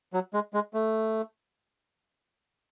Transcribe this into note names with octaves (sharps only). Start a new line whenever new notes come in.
F#3
G#3
G#3
A3